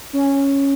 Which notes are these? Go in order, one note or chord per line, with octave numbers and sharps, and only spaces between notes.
C#4